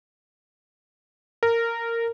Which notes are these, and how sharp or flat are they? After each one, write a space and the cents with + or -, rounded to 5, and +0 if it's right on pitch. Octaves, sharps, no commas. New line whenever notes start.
A#4 -15